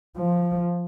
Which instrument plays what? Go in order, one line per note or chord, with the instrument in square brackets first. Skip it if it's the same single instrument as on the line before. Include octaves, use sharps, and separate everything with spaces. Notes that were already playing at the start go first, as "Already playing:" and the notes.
[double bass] F3